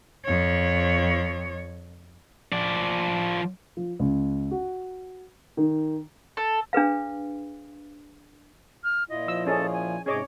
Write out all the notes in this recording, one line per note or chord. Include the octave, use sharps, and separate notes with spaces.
F2 C#5
F3 D5
F3
C#2
F#4
D#3
A4
D4 G#4 B4 F5
F6
A#2 E4 F4 D#5
F3 E6
C#4 G#4 A4 D#5
G#5
G#2 C3 C#4 G#4 C#5 D#5 D6